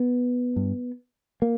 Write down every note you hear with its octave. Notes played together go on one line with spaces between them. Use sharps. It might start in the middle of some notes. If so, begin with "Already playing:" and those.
Already playing: B3
G2
A#3